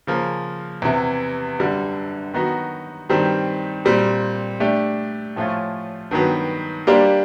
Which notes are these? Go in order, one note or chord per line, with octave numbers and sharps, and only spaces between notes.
C#3 F3 A#3
E2 C3 E3
F#2 D3 G3
D#3 F#3 B3 D#4 F#4
G2 D#3 G3 C4
A#2 G3 C4
A3 D4 G4
A2 F3 A3 C#4 F4
G2 D#3 F#3 B3
G3 A#3 D4 G4 C5